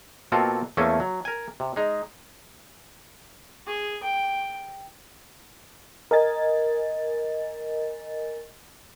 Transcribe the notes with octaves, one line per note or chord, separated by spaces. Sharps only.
B2 A#3 C4 F4 F#4 A4
E2 A3 A#3 C#4 A4 G#5
F#3
A#4 G#5
C3
G#3 D#4
G#4
G5
A#4 D#5 G#5 A6